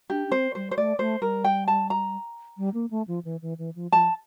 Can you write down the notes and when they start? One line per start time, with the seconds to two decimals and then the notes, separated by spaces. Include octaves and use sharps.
0.10 D4 G4
0.27 D4
0.32 C4 C5
0.55 G3 C5
0.71 C5
0.77 A3 D5
0.99 A3 C5
1.22 G3 A#4
1.44 G5
1.68 A5
1.90 A#5
2.58 G3
2.74 A#3
2.91 A3
3.08 F3
3.25 E3
3.42 E3
3.58 E3
3.75 F3
3.92 F3 A5